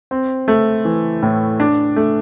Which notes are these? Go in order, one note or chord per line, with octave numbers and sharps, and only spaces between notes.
C4
A3
E3
A2
D4
A3